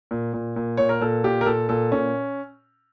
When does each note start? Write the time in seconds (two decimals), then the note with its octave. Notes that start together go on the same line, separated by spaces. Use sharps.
0.11 A#2
0.33 A#2
0.56 A#2
0.77 A#2 C#5
0.89 A#4
1.01 A#2 A4
1.24 A#2 G4
1.41 A#4
1.46 A#2 A4
1.69 A#2 A4
1.92 A#2 C#4